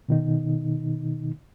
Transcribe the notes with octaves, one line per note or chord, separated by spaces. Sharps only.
B2 D#3 D#4